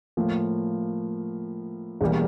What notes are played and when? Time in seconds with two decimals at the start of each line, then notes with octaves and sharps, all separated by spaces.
0.17 A2 F3 A#3
2.01 E1 E2 E3 G3 A#3